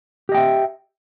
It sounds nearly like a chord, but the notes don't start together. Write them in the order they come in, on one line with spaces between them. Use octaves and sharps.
G4 D#5 G5 E5